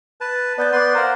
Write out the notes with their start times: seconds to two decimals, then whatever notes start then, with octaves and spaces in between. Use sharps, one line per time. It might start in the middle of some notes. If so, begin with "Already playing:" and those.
0.21 B4 A5
0.58 B3 B4 D5 G6 A6
0.73 B3 B4 C6 D6 F#6
0.95 A#4 C5 F5 F#5 A#5